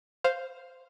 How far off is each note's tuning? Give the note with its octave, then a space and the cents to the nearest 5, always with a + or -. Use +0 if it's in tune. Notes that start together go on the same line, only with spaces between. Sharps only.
C5 +0 F5 +0